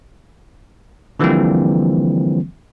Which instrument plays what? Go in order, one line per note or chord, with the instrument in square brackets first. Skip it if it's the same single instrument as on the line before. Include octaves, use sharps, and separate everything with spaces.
[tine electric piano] D3 E3 F3 G3 A#3 C4